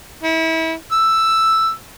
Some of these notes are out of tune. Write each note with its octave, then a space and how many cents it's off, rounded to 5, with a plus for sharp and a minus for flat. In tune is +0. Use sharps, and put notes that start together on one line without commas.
E4 -30
E6 +5